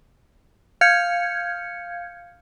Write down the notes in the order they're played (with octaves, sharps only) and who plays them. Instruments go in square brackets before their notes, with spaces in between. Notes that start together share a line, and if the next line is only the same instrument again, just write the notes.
[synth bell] F5 F6 G6 G#6 C#7